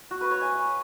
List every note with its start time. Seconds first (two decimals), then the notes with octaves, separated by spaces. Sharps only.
0.11 F#4
0.21 B4
0.31 C#5
0.41 G#5